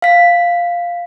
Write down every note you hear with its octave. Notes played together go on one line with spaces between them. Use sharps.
F5 B6